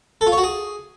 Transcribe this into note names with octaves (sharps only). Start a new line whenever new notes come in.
A4
F4
C#5
F#4
G#4